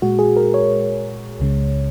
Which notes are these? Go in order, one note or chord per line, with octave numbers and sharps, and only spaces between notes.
A#2 G#3 F#4
G#4
A#4
C#5
C#2 C#3 G#3